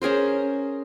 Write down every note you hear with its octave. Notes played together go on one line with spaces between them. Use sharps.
C#4 G#4 A#4 C5